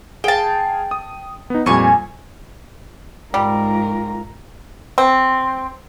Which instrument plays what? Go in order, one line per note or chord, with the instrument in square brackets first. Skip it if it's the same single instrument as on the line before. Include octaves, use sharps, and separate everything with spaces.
[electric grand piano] G#4 F5 [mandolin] G5 A5
[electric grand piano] D#6
B3 D#4
[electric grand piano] F2 A#2 G3 [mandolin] G#5 C#6
[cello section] G#2 [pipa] G3 [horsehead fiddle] F4 A#4
[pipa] C4